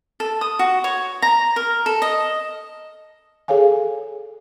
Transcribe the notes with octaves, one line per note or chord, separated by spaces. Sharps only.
A4
D#6
F#4
C#5
A#5
A#4
A4
D#5
G#4 A4 C#5 F5 G#5